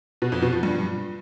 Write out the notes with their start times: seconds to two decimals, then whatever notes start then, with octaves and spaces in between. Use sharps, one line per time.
0.22 B2
0.32 F2
0.42 B2
0.53 F3
0.63 G2